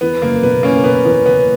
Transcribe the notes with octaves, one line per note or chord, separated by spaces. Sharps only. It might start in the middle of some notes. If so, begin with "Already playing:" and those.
E2 B3
F#1 A#3
B2 B3
B2 A#3 C#4
B2 B3
E2 B3
F#1 B3